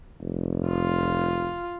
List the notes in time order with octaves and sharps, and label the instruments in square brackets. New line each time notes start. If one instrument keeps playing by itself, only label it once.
[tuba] F1
[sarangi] F4